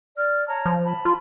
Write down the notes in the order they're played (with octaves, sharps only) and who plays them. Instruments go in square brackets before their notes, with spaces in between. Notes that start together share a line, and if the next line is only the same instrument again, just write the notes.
[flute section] D5 F6
C#5 A5 A#5
[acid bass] F3
[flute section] A5 B5
[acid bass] F4